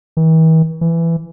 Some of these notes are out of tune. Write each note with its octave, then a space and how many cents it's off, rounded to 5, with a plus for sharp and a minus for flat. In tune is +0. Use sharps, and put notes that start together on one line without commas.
E3 -45
E3 +15